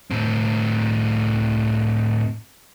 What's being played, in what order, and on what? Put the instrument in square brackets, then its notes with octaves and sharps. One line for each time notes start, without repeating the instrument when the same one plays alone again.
[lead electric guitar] A2 C4